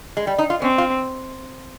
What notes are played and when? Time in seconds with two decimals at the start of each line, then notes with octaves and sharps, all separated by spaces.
0.17 G#3
0.27 G3
0.38 D#4
0.50 F4
0.62 C4 C#4
0.78 F4